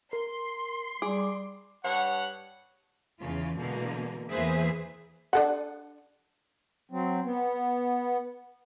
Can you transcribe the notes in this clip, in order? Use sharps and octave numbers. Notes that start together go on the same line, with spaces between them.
A#4 C6
G3 G#4 D6
G2 C#5 F#5
E2 C#3 F4
B2 D3 E3 G#3 A#3
E2 A#3 G#4 B4 C5 E5
D4 A4 F#5
F#3 C4
B3